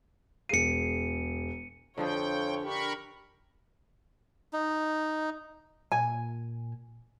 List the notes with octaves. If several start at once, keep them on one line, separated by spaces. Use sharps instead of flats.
E1 G#4 C7 C#7 D#7
F2 D3 F3 G#4 C#5 G5
D4 G4 A#4 B5 C#6
D#4
A#2 G#5